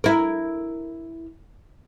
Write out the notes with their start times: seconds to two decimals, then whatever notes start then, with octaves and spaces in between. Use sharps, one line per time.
0.04 E4 A#4